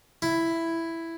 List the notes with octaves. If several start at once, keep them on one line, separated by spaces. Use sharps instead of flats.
E4